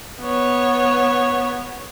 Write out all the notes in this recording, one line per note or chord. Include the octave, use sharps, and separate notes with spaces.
B3 C#5